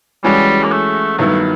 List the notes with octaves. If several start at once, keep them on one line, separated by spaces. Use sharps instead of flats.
E3 G3 G#3 C#4 F#4
A#3
A3
G2 D#3 F#3 A3 B3 E4